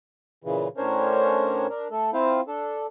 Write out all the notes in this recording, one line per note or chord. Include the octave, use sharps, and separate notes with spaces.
A#2 C#3 E3
A2 C#4 D4 A#4 C5 C#5
D4 A#4
A3 A4
C4 E4 F4 C5 F5
D4 A4